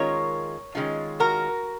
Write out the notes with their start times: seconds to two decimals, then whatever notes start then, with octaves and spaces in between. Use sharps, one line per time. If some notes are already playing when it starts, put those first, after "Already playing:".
Already playing: D#3 G#3 C#4 F4 A#4 C#5
0.75 D#3 G#3 C#4 F4
1.20 F#4 A#4